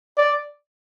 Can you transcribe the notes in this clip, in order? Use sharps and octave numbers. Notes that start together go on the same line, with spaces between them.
D5